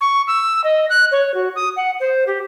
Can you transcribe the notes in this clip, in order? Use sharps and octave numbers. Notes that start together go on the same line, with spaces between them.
C#6
E6
D#5
F#6
C#5
F#4
D#6
F#5
C5
G4